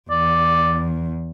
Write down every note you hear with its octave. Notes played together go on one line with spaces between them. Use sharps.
E2 D5